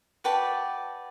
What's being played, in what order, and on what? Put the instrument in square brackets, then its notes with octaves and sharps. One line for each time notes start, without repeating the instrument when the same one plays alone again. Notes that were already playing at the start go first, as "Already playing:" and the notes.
[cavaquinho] F#4 B4 D5 G5 A5